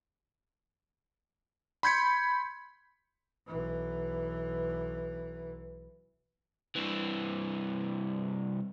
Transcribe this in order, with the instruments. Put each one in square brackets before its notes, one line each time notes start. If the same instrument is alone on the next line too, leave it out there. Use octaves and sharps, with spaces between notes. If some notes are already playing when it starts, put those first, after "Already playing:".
[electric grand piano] B5 C6 G6 G#6 B6 C#7
[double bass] B1 E3
[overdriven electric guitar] C2 E3